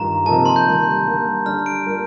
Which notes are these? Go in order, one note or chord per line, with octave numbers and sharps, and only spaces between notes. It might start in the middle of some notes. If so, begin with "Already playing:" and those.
Already playing: G2 D#3 F4 A#5
C3 F3 A#3 D#4 A4 A5
C6
G6
D#3 G3 A#3
D3 G3 A#3
G3 D4 A4 F6
D7
G3 A#3 F4 A#4